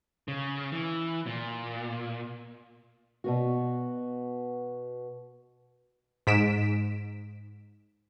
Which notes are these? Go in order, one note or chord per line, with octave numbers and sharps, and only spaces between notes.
C#3
E3
A#2
B2 B3 F#4
G#2 B6 D7 E7